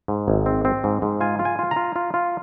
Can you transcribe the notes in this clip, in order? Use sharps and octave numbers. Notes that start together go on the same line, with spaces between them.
G#2
G#1
C4
C4
G#2
G#2
F4 G#5
F4
G#5
F4
A#5
F4
F4
F4